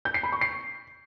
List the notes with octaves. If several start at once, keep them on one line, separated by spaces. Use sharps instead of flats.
G6
C7
B5
C#6
C7